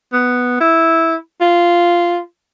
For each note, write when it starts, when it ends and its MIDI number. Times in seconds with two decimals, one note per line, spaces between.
0.13 0.59 59
0.60 1.15 64
1.41 2.19 65